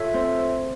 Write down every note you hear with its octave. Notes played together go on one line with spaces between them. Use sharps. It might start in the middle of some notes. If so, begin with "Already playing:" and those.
Already playing: F4 A4 C#5 E5
C4